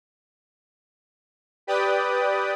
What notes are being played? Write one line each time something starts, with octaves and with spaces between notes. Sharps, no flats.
G4 B4 D5 G5 D#6